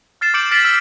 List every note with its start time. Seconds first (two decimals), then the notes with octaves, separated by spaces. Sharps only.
0.21 F6 A6 C7 E7
0.34 D6 G6 C#7 D7 F#7
0.51 F6 A6 B6 C7 D7 F#7
0.64 E6 F6 B6